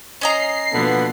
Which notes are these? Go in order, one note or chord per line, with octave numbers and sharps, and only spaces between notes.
C#4 D#5 A#5 C7
B2 D3 F3 A#3 B3